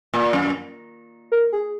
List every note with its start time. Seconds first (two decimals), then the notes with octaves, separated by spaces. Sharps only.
0.14 A#2
0.33 F#2
1.32 A#4
1.53 G#4